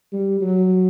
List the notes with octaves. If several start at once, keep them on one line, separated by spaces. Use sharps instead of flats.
G3
F#3